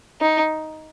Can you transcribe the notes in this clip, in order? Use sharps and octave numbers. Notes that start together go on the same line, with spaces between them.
D#4